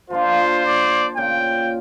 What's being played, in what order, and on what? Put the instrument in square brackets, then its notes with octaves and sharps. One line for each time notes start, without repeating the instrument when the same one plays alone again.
[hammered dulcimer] F3 A#3 D4 [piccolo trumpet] F4 [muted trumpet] C5
[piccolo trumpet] D5
[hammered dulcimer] A#2 C#3 F4 [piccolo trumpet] G5